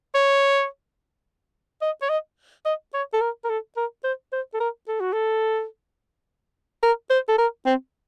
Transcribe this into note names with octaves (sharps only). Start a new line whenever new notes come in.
C#5
D#5
C#5
D#5
D#5
C#5
A4
A#4
A#4
A4
A#4
C5
C5
A4
A#4
A4
F#4
A4
A#4
C5
A4
A#4
C4